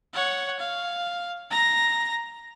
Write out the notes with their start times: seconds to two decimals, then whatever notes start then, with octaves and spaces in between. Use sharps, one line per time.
0.13 C#5 F#5
0.60 F5
1.51 A#5 A#6